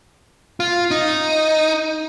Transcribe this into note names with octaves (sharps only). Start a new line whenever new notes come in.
F4
D#4